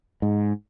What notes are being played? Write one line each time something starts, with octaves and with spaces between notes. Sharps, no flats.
G#2